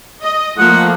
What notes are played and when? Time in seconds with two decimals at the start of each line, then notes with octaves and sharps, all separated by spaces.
0.23 D#5
0.59 F3 A3 A#3 F#5